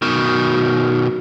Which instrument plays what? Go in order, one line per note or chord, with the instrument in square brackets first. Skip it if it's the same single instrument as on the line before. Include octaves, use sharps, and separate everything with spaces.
[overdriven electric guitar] B2 D#3